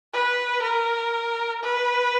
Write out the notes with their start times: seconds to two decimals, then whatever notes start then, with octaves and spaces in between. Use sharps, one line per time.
0.14 B4
0.63 A#4
1.63 B4